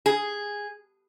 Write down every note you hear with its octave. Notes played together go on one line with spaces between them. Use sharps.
G#4